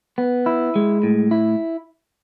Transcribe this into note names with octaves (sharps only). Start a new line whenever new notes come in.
B3
E4
G#3
A2
E4